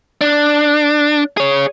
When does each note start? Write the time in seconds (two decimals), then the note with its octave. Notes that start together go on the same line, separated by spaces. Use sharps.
0.21 D4
1.37 G#4 C#5